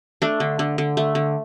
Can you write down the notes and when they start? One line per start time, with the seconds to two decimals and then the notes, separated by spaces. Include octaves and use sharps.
0.22 A3 D4
0.40 D3
0.59 D3
0.78 D3
0.97 A3
1.15 D3